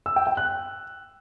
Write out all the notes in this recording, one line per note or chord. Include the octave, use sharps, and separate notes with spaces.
E6
G5
G5
F#6